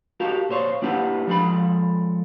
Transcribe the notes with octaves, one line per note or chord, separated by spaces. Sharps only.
F#4 G4 A4 A#4 F5
A#2 C5 C#5 F5
A#3 D4 E4 G4 B4 F#5
F3 G#3 A4 G5 B5